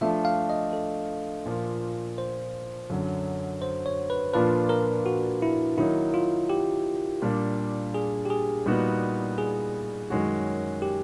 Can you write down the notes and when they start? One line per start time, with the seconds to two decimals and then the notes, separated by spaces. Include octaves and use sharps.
0.01 F3 A3 D4 F4 E5
0.25 F5
0.50 D#5
0.73 A4
1.46 A#2 F3 A#3
2.18 C5
2.90 F#2 D3 F#3
3.62 C5
3.86 C#5
4.10 B4
4.34 A#2 F3 A#3 D4 F4 B4
4.69 A#4
5.06 F#4
5.42 E4
5.77 D#3 F#3 A#3 D#4 E4
6.14 F4
6.50 G4
7.22 A#2 G3 A#3 D4
7.94 G#4
8.25 G4
8.30 G#4
8.66 A#2 G3 B3 D#4 F#4
9.38 G#4
10.10 F#2 D#3 G#3 C#4 F#4
10.82 G4